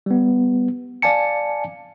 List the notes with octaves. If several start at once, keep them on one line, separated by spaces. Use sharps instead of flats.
G3 B3
D5 F5 G#5 A5 C#7